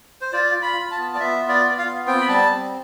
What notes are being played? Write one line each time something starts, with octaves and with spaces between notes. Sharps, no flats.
C5
F4 D5
F4
B5
F4
A5
B3
D5
B3 E5
F4
D5
F4
F5
B3
C4 G5
B5
G3 A5
C4